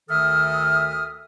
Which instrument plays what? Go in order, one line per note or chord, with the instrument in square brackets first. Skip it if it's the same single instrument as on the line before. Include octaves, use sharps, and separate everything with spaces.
[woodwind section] D2 D#3 A4 E5 D#6 F6